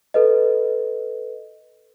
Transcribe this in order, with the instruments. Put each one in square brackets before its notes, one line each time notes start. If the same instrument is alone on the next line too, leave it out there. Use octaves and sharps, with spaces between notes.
[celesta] A4 B4 D#5